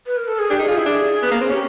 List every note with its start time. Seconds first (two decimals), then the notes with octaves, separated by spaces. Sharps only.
0.06 B4
0.17 A#4
0.28 A4
0.39 G#4
0.50 D4 G4
0.59 D#4
0.64 A4
0.68 F4 G#4
0.77 E4
0.86 D4
1.23 B3
1.31 A#3
1.41 C4
1.50 C#4 G4